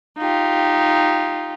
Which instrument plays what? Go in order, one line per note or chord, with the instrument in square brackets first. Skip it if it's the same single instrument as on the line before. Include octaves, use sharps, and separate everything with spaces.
[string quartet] D#4 F4 G4